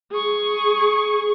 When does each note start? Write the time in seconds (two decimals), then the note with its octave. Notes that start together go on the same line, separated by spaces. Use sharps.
0.12 G#4 C#6